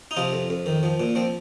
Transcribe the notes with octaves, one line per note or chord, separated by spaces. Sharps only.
D#4
C3 F3 F4
F2
F2
D#3
F3
A#2
F3 C4